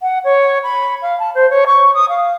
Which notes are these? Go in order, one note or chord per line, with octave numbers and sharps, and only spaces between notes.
F#5
C#5
B5
F5
A5
C5
C#5
C#6
D#6
F5